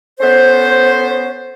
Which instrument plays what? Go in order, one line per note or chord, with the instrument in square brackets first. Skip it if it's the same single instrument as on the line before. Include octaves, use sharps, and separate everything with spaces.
[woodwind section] B3 C#4 A4 C5